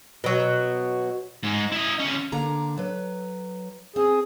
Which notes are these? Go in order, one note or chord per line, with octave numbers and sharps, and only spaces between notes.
B2 F#3
G#2 G#3
E4 D#5
D3 C#4
D3 A#3 A#5
F#3 B4
C4 G#4